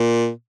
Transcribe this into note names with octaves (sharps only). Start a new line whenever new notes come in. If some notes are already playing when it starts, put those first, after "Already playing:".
Already playing: A#2